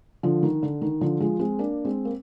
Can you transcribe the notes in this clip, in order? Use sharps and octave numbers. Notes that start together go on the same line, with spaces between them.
D3 F3
D#3
D3
D#3
D3 F3
F3 G#3
G#3 C4
A#3 D4
G#3 C4
A#3